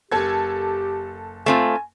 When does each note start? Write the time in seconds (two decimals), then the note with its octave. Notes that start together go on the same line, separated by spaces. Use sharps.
0.12 F#1 G4 A4 G#6
1.46 A3 C4 F4 G#5